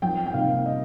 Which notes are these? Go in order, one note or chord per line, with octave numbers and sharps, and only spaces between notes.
F2 G5
G5
C3 G3 A#3 D#4 F5
D#5